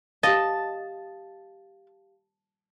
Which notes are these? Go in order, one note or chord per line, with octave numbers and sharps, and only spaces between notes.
G4 D#5 F5 A5